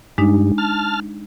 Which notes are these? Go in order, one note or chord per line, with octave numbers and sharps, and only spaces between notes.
G2 G#3 D4 D#4
A5 F6